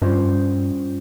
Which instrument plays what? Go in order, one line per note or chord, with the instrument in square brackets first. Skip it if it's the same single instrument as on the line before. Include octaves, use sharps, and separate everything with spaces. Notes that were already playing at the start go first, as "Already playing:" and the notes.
[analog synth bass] G2 [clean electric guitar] G3 C#4 F4 C5 D#5